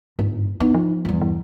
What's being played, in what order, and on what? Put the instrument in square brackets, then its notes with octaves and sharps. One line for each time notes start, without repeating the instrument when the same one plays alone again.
[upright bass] G1 [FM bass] G#2
[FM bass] B3 [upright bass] D#4 E4
[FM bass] F3
[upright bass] E2 G2
[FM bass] E3